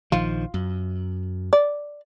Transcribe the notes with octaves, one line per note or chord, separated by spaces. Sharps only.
A#1 D#3 F3 F4
F#2
D5